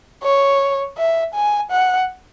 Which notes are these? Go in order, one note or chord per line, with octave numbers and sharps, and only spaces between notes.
C#5
E5
G#5
F#5